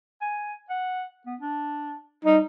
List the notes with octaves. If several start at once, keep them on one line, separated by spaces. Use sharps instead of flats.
G#5
F#5
B3
D4
G3 D#4